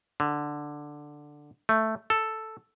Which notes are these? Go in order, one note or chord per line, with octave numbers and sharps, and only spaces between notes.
D3
A3
A4